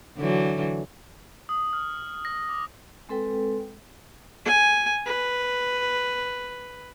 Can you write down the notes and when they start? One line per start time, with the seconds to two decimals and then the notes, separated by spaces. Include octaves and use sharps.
0.17 D3 E3 F#3
1.49 D#6
1.73 F6
2.25 A#6
2.49 D6
3.09 G#3 C4 A4 B4 G5
4.45 G#5
5.06 B4